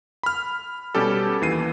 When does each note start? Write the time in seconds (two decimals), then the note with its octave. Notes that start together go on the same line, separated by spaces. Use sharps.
0.23 B5 F6
0.95 B2 G3 C#4 G4 A4
1.41 D#2 E3 C7 D#7